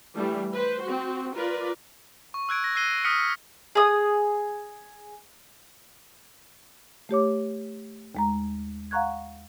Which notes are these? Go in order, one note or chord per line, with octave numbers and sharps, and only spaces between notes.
E3 G3 A3 D4
B4 C5
C4 F#4
F4 A#4 B4 D5
C#6
E6 F#6 G#6 D7
A#6
E6 F#6 A#6 C7 D#7 G7
D#6 F6 B6 C#7 D7
C#7
G#4 D#6
A3 G4 C#5 D6
D#2 G#3 A#5
F5 F#5 A#5 C#6 F#6 G#6